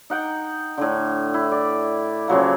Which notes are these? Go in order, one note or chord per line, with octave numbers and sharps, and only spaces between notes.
D#4 F#5 G5
A2 D3
E4
D5
C#3 F3 F#3 A#3